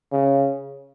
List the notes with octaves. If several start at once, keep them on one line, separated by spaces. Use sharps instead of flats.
C#3